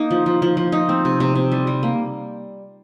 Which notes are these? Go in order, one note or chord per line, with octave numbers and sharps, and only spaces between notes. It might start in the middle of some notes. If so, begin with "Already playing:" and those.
Already playing: A#3 D#4
F3
F3
F3
F3
D#4
C4
C3
C3
C3
G3
G3
A#3